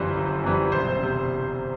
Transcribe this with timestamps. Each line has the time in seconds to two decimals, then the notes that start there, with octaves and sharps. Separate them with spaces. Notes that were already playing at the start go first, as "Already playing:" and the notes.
Already playing: G1 F#2 E3 G3 C5
0.16 G1
0.44 F#2 E3 G3
0.72 E1 C5
1.03 C3